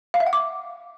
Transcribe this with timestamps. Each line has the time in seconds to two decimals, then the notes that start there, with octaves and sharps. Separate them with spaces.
0.14 F5
0.20 E5
0.27 F#5
0.33 D6